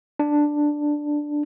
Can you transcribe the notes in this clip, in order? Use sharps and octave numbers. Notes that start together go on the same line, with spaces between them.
D4